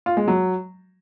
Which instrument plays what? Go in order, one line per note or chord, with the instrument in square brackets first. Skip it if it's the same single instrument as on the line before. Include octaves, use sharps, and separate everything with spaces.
[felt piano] F4
G#3
F#3